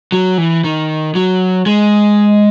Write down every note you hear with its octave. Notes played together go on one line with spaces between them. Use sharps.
F#3
E3
D#3
F#3
G#3